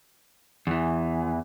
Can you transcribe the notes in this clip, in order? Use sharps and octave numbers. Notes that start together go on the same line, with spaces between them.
E2 E3